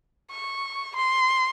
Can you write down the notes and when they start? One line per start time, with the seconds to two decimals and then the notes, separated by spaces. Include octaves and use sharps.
0.31 C#6
0.96 C6